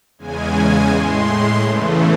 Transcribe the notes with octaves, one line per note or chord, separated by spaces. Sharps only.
E2 C#3 G#3 G#5
A2 G#3 C6
E2 C#3 E3 A3